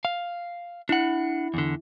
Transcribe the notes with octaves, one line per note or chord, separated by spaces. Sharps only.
F5
D4 E4 F#5
E2 D3